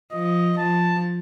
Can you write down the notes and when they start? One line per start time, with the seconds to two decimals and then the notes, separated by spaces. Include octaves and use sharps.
0.12 F3 D#5
0.58 F3 A5